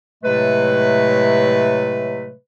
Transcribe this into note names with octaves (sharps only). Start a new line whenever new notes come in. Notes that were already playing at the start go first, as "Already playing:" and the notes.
A2 C3 F#3 G#3 A3 B4